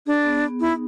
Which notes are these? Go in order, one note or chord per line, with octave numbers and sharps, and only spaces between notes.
D4 G#4
B3
B3
D#4 E4